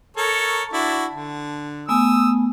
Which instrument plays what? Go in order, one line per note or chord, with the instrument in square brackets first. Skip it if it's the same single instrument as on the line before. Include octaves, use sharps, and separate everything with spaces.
[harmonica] A4 A#4 C#5
[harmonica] D4 E4 F#4 [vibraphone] A5
[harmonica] D3
[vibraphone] A3 B3 G#5 [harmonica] D#6 E6